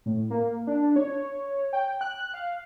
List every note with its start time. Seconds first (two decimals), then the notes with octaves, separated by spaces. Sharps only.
0.06 A2
0.30 A#3
0.67 D4
0.96 C#5
1.73 G5
2.01 F#6
2.34 F5